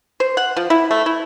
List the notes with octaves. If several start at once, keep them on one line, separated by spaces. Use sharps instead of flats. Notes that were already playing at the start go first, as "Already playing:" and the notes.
C5
F#5
F3
E4
A3
E4